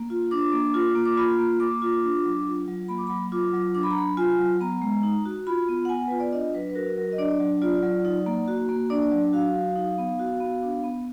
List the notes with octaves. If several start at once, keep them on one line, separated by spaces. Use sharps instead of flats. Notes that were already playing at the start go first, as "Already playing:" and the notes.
Already playing: A#3
F4
D4 D6
A#3
F4
A#3
D6
F4 B5
A#3
A#3 D6
F4
D4
F#3
F4
F#3
A#3 B5
D6
F#3 B5
F4 D6
F#3
D4 D6
B5
A#5
F#3 B5
F4 G#5
F#3
B3 A#5
G#3
D#4
F#4
F4 B5
B3
F#5
B3 G#5
F4 B4
D5
D4 D#5
F#3 B4
B4
F#4 A#4
F#3 A#4
D#5
D4 D5
F#3
F4 D5
F#3
D#4
A#3
F#4
A#3
D4 D5
F#3
F#4 F5
F#3
D#4
B3
F#4
B3
D4
B3